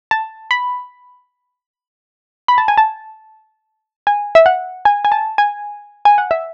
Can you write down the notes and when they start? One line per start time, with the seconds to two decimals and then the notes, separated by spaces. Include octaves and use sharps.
0.11 A5
0.51 B5
2.48 B5
2.58 A5
2.68 G#5
2.77 A5
4.07 G#5
4.35 E5
4.46 F#5
4.85 G#5
5.05 G#5
5.12 A5
5.38 G#5
6.05 G#5
6.18 F#5
6.31 E5